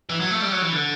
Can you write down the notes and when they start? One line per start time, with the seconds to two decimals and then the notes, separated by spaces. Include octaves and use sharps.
0.10 E3
0.20 F#3
0.31 A3
0.42 G3
0.52 F#3
0.62 E3
0.72 D3